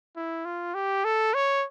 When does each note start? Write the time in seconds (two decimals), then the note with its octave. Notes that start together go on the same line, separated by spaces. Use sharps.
0.17 E4
0.45 F4
0.74 G4
1.05 A4
1.34 C#5